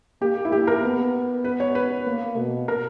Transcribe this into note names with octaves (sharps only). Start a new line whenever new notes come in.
A#3 G4
E4
A#3 G4
A#4
B3
B4
C#5
B4
A#3
B2
A#4